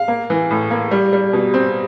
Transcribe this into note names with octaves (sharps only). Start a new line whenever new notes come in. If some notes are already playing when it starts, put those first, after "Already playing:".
Already playing: F5
A#3
E3
A2
A#3
G3
G3
B2
C4